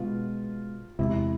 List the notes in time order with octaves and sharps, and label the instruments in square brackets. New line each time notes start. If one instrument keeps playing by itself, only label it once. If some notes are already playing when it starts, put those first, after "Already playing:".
Already playing: [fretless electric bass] B2 G#3 B3 [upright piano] F4
[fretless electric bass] E2 C3 G#3 C4 [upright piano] E4